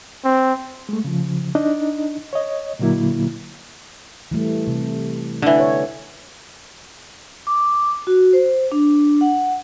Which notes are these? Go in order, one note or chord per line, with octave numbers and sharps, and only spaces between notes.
C4
G#3 A3
C#3 F3
D4 D#4 D#5
C#5 D#5
A#2 D3 F#3 A#3 E4
E3 G3 A3
C3
D3 E3
C#5
D6
F#4
C5
D4
F#5